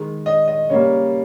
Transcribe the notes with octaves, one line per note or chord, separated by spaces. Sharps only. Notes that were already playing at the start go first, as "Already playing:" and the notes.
Already playing: D#3 G#3
D#5
D#5
C#3 G3 A#3 C#5